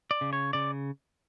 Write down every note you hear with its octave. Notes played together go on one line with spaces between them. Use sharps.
D5
C#3
C#5
C#3 D5